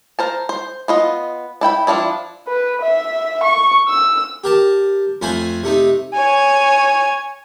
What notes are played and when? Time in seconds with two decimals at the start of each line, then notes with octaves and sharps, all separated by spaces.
0.19 A#4 C5 A5
0.49 C5
0.88 B3 F4 D#5
1.61 D4 E4 G5 B5
1.87 F3 F#3 D4 E4
2.47 B4
2.82 E5
3.43 C#6
3.89 E6
4.44 G4 A#4 A5
5.22 F2 A3 F4 C5 G#5 B5
5.63 C3 A3 D#4
6.13 C#5 G#5